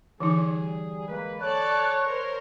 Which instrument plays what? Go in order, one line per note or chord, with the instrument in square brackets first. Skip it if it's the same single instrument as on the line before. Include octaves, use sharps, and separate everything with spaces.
[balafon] D3 E3 D#4 [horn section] G3 G#4
[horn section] G#3 A#3 B4
[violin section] A4 D5 A5 [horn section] C#5 [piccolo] F#6
[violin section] A#4 C5